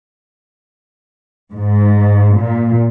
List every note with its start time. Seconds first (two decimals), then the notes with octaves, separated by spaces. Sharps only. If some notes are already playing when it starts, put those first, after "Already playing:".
1.54 G#2
2.37 A#2